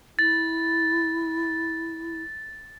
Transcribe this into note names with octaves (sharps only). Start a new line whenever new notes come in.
E4 A6